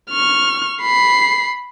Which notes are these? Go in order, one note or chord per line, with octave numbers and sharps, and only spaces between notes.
C#6 F6
B5 C7